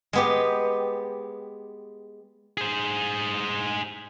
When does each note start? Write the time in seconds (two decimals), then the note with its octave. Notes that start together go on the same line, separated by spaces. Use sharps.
0.13 G#3 B3 G4
2.57 G#4 C5